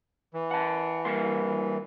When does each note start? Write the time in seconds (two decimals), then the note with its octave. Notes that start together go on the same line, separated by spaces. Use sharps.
0.34 E3
0.51 F#5 A5
1.05 G2 A#3 C6